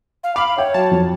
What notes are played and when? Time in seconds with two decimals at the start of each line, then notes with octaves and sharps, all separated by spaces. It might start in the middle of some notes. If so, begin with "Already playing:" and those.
0.24 F5
0.36 F5 B5 D6
0.58 C#5 E5 G5
0.74 F#3 A5
0.91 F2